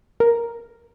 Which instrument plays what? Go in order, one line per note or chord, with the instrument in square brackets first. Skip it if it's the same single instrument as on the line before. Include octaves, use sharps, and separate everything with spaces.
[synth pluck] A#4